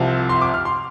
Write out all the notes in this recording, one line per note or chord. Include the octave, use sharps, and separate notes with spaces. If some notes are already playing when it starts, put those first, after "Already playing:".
Already playing: C2 C3 F3
C6
D6
F6
C6